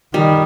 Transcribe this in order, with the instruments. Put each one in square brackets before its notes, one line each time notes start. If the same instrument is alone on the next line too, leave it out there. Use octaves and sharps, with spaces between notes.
[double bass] D#3 [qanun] G3